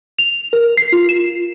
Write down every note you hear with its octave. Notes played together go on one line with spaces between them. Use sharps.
F7
A#4
C7
F4
E7